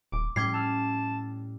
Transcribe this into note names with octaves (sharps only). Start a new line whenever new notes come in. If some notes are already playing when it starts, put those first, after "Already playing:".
D#1 D6
A2 G3 C#4 D6 G#6 C7
A5 E6 F6